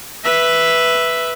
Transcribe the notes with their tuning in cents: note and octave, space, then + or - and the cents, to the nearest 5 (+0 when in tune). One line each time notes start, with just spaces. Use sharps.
B4 +0 E5 +0